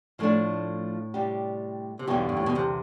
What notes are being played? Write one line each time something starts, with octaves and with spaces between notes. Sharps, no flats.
A2 F3 A3 D4
C3 G3 D4 G4
C3
B1 E2 B2 D3 G3 C4 G4
G2
A2
B2
C2 C3